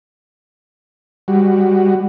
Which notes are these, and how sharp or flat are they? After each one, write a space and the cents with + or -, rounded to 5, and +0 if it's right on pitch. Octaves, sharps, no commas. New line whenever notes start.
G3 +20 F#4 +10